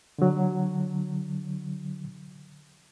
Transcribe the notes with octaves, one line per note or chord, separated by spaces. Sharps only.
D3 F#3